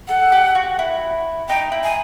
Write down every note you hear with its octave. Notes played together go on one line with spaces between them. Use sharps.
A4 F#5
G4
F#4
E4
D#4 G5
E4
G#5